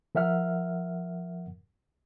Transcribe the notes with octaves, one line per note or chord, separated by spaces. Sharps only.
F3 A#4 E5 F#5 F6